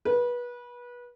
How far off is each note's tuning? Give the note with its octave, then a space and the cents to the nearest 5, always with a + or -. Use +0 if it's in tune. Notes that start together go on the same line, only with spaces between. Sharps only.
B4 -25